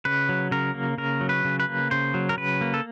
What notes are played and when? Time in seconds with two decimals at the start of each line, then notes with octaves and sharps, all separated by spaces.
0.05 C#3 B4
0.29 F#3
0.51 C#3 A#4
0.74 A#3
0.98 C#3 A#4
1.21 F#3
1.29 B4
1.45 C#3
1.60 B4
1.69 A#3
1.91 C#3 C5
2.14 F#3
2.29 A#4
2.37 C#3 B4
2.61 A#3
2.74 A4